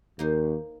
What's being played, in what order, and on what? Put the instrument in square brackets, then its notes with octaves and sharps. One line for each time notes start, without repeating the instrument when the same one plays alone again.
[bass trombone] D#2 [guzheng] A#3 D#4 C5